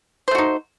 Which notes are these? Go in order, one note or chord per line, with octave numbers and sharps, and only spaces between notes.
A3 D#4 F#4 C5